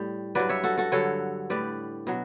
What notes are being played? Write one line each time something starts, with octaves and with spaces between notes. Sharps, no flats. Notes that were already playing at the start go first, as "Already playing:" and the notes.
Already playing: A2 G3
G2 F#3 B4 D5
C#5 E5
F#4 A4
F#4 A4
G2 D3 F#3 A4 C#5
A2 G3 B4 D5
B2 F#3